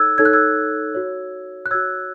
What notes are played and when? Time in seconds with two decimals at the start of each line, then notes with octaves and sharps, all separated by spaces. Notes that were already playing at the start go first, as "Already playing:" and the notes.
Already playing: D#4 A4 C#5 E6 F#6 G#6
0.18 D#4 A4 C#5 G#6
0.25 F#6
0.33 E6 G#6
0.95 F#4 C#5
1.66 F#6
1.71 F#4 C#5 E6 G#6